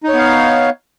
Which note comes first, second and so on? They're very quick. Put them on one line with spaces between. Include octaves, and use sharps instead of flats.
D#4 C#5 B3 F5